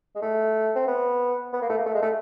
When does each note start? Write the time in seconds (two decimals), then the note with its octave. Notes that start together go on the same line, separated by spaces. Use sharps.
0.16 G#3
0.22 A3
0.75 C4
0.88 B3
1.53 B3
1.62 A#3
1.69 A3
1.78 A#3
1.86 A3
1.94 G#3
2.02 A3